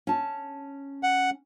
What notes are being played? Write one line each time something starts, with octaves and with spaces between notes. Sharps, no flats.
C#4 A5
F#5